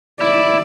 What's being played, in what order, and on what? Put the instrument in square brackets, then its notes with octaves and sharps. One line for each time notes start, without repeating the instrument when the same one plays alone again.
[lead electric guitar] E4 [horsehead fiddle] D5